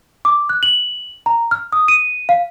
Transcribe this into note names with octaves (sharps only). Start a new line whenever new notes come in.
D6
F#6
F#7
A#5
F6
D#6
D#7
F5